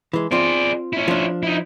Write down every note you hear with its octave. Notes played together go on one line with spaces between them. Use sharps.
E3 G#3
C4 F4 G#4 D5
C#4 E4
F3 D4
D#4 E4